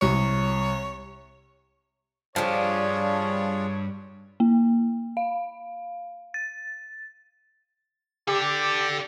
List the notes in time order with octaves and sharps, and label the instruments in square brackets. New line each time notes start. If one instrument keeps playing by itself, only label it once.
[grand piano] C2 [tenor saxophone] C#5
[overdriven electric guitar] G2 G4 [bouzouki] F3 G3 [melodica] D4 F4 G#4 [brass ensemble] C#5
[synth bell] A#3
F5
A6
[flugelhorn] G4 [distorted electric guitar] A4 D5